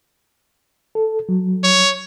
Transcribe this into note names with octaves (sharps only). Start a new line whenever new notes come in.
A4
F#3
C#5